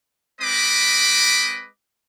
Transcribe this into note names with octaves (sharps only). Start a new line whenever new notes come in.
G#3 C4 B4 D#5 B5 D6